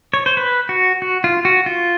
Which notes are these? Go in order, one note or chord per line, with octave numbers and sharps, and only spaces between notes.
C#5
C5
B4
F#4
F#4
F4
F#4
F4